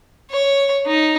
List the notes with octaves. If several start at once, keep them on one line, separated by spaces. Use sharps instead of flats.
C#5
D#4